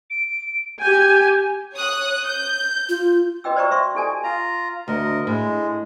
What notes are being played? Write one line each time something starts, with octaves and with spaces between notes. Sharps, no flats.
D7
G4 G#5 G6
C#5 D#6 F#6
G6
F4
F#4 B4 D#5 G5 E6
C5 D5 D#5 G5 A#5 C#6
F#4 E5 C6 C#6
E4 G4 A4 D5 G#5 A5
F4 A#5
D2 A#4 D#5
A2 G#3